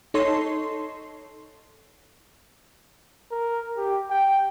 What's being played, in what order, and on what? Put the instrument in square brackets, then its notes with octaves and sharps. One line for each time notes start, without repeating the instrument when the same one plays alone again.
[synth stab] D#4 A4 C#5 C6
[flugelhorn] A#4
G4
G5